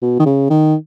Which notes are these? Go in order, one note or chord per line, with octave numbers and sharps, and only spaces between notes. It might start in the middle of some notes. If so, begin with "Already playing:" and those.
B2
D#3
C#3
D#3